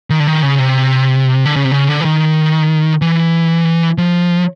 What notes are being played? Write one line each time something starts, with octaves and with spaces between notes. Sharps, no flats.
D#3
D3
D#3
C#3
C3
D3
C#3
C3
C#3
D3
E3
D#3
E3
F3